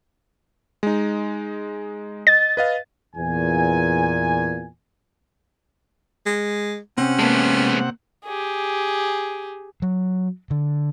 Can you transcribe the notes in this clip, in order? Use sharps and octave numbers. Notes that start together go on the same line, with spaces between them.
G#3 D#4
D#5 A6
B4 D#5 F5
E2 A#2 G#5
G#3
C3 C4 C#4 F#5
G#3 A#3 B3 A5
G4 G#4
F#3
D3